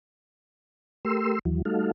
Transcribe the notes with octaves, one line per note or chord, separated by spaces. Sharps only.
A3 G4 A#4 C6 E6
D#2 E3 F#3
G3 A3 D#4 F#4 A4 F5